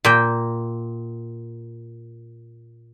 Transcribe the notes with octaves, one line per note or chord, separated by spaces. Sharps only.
A#2 G5